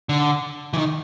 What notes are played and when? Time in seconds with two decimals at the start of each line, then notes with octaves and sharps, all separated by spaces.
0.09 D3
0.73 E3
0.78 D#3